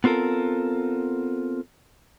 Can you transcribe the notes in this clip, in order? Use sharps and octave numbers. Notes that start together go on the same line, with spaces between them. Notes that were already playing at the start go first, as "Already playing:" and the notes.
B3 C4 F4 A4 A#4